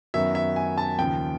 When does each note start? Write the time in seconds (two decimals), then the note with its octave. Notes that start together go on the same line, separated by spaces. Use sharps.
0.14 F#2 D#3 F#3 B3 E5
0.35 E5
0.56 G#5
0.78 A5
0.98 D#2 C#3 F3 G5